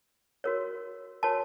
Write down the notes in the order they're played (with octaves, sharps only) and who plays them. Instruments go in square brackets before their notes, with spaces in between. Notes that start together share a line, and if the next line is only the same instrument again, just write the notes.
[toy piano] F#4 A#4 C#5
F#4 A#4 C#5 A5